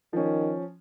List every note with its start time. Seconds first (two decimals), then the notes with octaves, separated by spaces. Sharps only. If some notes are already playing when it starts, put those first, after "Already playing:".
0.13 D#3 F3 C#4